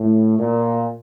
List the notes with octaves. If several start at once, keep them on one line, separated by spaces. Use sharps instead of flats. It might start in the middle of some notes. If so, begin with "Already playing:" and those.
Already playing: A2
A#2